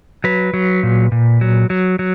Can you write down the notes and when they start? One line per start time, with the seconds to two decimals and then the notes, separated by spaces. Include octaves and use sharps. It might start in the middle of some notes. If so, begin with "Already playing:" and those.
0.24 F#3 B4
0.54 F#3
0.83 A#2
1.12 A#2
1.41 F#3
1.70 F#3
1.99 F#3